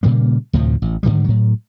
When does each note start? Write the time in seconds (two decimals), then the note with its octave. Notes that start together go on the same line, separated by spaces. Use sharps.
0.03 A#2 C#3 G3 A#3
0.53 D2 A2 C3 F3
0.82 A1
1.03 G#2 D3 D#3 G3
1.24 A2 F#3